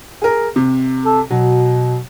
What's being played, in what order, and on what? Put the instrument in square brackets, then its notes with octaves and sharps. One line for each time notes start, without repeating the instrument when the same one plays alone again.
[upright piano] G#4 A#4
C3
[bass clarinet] A4
[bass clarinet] B2 [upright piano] F#3